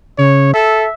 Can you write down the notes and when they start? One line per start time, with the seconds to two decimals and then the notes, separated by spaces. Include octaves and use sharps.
0.18 C#3 C#5
0.54 A4 E5